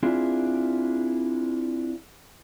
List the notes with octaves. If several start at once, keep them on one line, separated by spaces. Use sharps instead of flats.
C4 D4 E4 F4 G#4